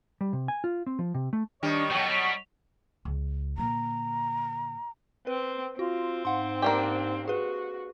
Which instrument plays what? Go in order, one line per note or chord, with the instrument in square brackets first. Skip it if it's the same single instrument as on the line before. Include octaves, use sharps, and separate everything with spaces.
[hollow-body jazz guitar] G3
C3
G#5
F4
C4
F3
C3
A3
[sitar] D#3 G3 [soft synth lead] D4 [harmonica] C#5 D#5 C#6
[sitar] B2 F#3 [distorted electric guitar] D#3 A3 [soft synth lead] G5
[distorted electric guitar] G3 [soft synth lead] B6
[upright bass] C#2
[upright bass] A#2 D3 [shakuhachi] A#5
[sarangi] C4 [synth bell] B4
[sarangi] C4 [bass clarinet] F4 [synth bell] F#4
[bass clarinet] G#2 [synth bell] F5 F#5 C6
[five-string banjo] A#3 D4 G4
[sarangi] F#4 [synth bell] G#4 B4